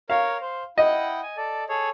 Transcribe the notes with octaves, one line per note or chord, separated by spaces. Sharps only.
A#4 C#5 F5
C5
E4 D#5 F#5 G5
G#5
A4 D5
G#4 A4 C#5